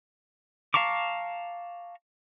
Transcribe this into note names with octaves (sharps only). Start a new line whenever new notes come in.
F5 A5 A#5 C#6 D6